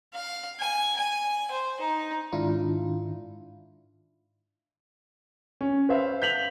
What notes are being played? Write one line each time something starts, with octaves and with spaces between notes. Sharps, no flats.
F5
G#5
G#5
C5
D#4
G#2 D#3 D4 E4 F4
C#4
B4 C5 E5 F5
G6 B6 F7 F#7